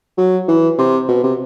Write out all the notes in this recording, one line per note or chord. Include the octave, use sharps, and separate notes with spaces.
F#3
E3
C3
B2
C3